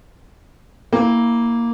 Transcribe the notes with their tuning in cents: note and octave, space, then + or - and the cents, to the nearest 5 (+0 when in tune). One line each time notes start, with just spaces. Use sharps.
A#3 +0 E4 -15 G5 +30